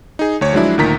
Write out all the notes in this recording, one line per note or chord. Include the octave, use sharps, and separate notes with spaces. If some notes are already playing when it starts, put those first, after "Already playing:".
D#4 G#4
D2 C#5
F3 F#3 G#3 D4 E4
D2 A#2 D#3 A#5 B6